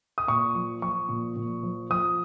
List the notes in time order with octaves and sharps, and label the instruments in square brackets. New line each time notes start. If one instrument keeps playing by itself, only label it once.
[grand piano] D#6
A#2 C#6
F3
F3 C#6
A#2
A#2
F3
F3 D#6